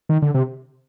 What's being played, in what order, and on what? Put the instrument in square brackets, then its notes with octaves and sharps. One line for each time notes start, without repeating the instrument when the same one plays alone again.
[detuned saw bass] D#3
D3
C3